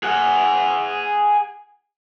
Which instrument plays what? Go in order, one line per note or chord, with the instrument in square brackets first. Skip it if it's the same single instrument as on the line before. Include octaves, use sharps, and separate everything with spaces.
[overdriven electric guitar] G#4 F#5